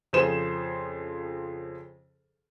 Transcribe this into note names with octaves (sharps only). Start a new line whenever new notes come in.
F2 C#3 F3 G#4 C5 E7